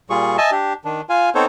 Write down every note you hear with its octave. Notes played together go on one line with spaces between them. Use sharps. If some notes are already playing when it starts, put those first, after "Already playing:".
A#2 G3 F4 G#4 C#6
D#5 E5 G#5 A5
D4 G4
D#3 D4
F4 F5 G#5
B3 C4 D#4 A4 C5 C#5